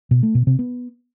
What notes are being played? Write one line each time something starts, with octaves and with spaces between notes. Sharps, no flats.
B2
A3
B2
C3
B3